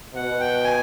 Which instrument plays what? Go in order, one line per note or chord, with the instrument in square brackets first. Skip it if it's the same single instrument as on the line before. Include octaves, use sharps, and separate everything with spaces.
[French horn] B2 [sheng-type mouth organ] F#5
[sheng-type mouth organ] G5
G#5